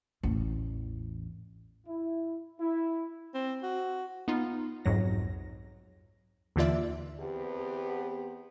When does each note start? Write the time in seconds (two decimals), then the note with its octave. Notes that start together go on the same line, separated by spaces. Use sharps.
0.23 A1 E2
1.87 E4
2.60 E4
3.34 C4
3.63 F#4
4.28 B3 D#4 F4
4.85 B1 F2 G#2 F#3 A#6
6.56 D#2 D3 E3 F4 D5 E5
7.20 E2 B3 C4 G4